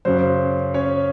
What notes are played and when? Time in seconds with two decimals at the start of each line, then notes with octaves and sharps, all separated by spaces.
0.05 F#2 C#3 F#3 C5
0.74 C#4 C#5